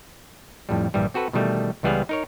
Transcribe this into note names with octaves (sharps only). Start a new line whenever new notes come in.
F2 A2 G3
A#1 G2 E3 G3
C4 F#4 A4 B4
B2 D#3 E3 G3 A3
C#2 E3 G3 B3 G#4 F5
D#4 A#4 C#5